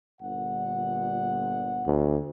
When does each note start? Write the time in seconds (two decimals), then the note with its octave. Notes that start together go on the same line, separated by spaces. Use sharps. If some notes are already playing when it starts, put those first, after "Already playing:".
0.21 G1 A#2 F#5
1.87 D2